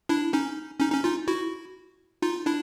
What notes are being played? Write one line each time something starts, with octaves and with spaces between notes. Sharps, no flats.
D4 E4
C#4 D#4
C#4 D#4
C#4 D#4
D#4 F4
E4 F#4
D#4 F4
D4 E4